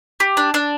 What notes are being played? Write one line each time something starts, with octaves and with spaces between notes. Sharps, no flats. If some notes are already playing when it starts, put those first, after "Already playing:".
G4
D4
D4